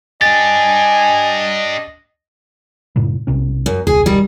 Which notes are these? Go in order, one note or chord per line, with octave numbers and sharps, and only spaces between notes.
D4 G4 D#5 G#5 A6
F#2 A2 C#3
B1 C3 C#4
F#2
E1 C#2 G#4
D#3 G3